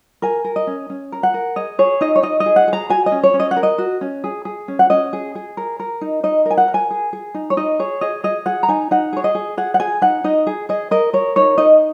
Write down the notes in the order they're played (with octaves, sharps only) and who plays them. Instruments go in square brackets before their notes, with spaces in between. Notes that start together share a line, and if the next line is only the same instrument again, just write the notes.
[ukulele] A#4 G#5
A#4
D#5
C#4
C#4
A#4
F#5
A#4
G#4 D#5
G#4 C#5
D#4 D#5
C#5
D#4 D#5
D#5
G#4
F#5
G#4
A#5
F#4 G#5
D#5
C#4
C#5
C#4
D#5
F#5
A#4
D#5
F#4
C#4
G#4
G#4
C#4
F#5
C#4 D#5
G#4
G#4
A#4
A#4
D#4
D#4 D#5
A#4
G#5
F#5
A#4
G#5
G#4
G#4
D#4
C#5
D#4 D#5
G#4 C#5
G#4 D#5
G#4 D#5
G#4 F#5
A#5
D#4 G#5
D#4 F#5
G#4 C#5
D#5
G#4
G#4 F#5
F#5
G#4 G#5
D#4 F#5
D#4 D#5
G#4
G#4 D#5
A#4 D#5
A#4 C#5
D#4 C#5
D#4 D#5